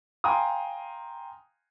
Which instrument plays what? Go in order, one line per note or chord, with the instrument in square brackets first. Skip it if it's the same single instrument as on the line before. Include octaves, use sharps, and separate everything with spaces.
[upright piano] F5 G5 G#5 A#5 C6 D#6